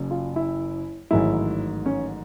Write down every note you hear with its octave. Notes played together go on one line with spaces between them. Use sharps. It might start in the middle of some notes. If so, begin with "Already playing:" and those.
Already playing: F#1 F#2 C#3 F#3
F4
E4
A1 G#2 D#3 F#3 E4
C#4